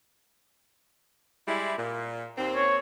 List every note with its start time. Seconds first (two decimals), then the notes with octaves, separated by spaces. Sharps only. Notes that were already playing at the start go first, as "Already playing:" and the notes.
1.48 G3 G#3 E4
1.78 A#2
2.38 D#2 C4
2.56 C#5